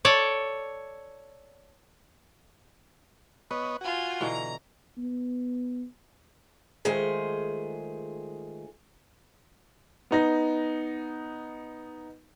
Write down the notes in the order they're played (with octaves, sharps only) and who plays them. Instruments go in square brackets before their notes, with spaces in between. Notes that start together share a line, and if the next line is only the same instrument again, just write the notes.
[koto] A4 C#5 D5
[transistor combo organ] B3 C#5 D#5 [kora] B4
[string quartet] F4 G#5 [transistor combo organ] F#4
[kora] B2 D3 E3 [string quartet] A#5
[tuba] B3
[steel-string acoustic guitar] D#3 G#3 A3 F4 G#4 C5
[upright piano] B3 D#4 A#6